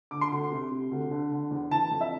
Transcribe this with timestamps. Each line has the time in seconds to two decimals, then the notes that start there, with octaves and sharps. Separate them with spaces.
0.11 D3 D6
0.21 C6
0.32 D2
0.52 C3
0.71 C3
0.91 D2
1.11 D3
1.32 D3
1.51 E2
1.71 E3 A5
1.91 F2
2.01 E5